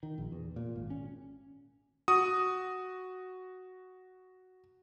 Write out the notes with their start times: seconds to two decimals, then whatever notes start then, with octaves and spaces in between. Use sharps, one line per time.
0.03 D#3
0.18 A#1
0.32 E2
0.56 A#2
0.76 G#1
0.90 C#4
2.08 F#4 D#6